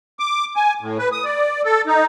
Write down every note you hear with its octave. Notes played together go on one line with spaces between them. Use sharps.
D6
G#5
A2
B4
D#6
D5
A4
D#4